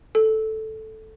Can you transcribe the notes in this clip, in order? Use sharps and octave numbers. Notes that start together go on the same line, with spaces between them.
A4